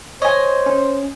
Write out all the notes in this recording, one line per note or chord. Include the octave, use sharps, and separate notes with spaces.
C5 C#5 D#5 G#5
C#4